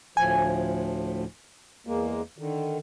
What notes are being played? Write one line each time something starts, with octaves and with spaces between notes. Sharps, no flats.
D2 A2 F3 G#5
E2 G#3 A#3
D3 D#3